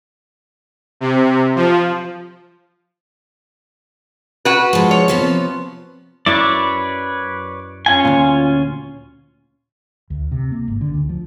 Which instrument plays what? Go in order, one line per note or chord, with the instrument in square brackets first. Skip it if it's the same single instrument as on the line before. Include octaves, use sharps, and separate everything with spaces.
[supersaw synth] C3
F3
[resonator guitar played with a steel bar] F#4 B4
[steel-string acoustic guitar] F3 G#3
[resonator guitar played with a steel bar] C#5
[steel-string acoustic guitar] C3 F3 B3
[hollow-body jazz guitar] F#2 E4 [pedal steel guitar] B4 C#5 D5
[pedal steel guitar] C#4 F4 G#5
[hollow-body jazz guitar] D2 A#2
[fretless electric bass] D2
C3
A#3
G#1
D3
D2
F3